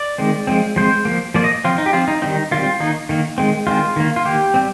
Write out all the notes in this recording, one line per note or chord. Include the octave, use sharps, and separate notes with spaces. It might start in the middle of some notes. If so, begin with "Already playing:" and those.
Already playing: D5
D#3 G#3 C4
F3 G#3 C4
F3 G#3 C4 C5
F3 A#3
F3 A#3 D5
D#5
F3 C4 F4
D#4
G4
F3 C4 F4
D#4
D#3 G3 C4 D#4
D#3 G3 C4 F4
D#3 A#3 D#4
D#3 A#3
D#3 G#3 C4
D#3 G#3 C4 F4
D#3 A#3
F4
D#3 A#3 G4
G3 C4